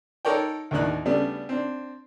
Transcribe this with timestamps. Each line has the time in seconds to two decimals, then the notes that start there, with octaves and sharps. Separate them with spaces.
0.25 D#4 A4 A#4 C#5 D5 G5
0.71 D#2 A2 D#3 D4 D#4 F#6
1.05 C#3 G3 A3 B3 D4
1.49 C4 D4